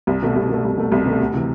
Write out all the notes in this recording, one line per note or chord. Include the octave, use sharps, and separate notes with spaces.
C2
B2 A3
C2
B2 A3
C2
B2 A3
C2
B2 A3
D2
C3 E3